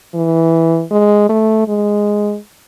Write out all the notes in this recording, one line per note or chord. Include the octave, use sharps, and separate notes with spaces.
E3
G#3
A3
G#3